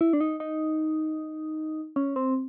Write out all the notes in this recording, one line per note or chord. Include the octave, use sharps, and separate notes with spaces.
E4
D4
D#4
D#4
C#4
C4